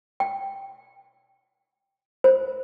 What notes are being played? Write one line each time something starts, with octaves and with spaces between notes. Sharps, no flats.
G5
C5